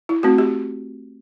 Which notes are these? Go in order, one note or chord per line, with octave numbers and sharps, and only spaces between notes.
E4
A3 C4 F#4
G4